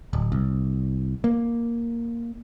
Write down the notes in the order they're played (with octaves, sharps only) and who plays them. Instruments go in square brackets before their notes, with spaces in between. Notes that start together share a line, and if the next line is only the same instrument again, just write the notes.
[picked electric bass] D1
C2
A#3